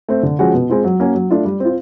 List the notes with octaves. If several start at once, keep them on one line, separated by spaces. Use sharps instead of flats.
A3 C4
D3
F3 G#3 C#4 F#4
B2
G#3 C4 F4
F#3
A#3 C#4 F#4
F#3
A3 D4 F4
G3
C4 F4